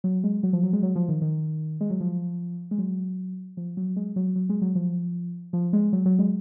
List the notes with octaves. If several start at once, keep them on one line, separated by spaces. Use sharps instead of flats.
F#3
G#3
F#3
F3
F#3
G#3
F#3
F3
D#3
D#3
G#3
F#3
F3
G#3
F#3
F3
F#3
G#3
F#3
F#3
G#3
F#3
F3
F3
G#3
F#3
F#3
G#3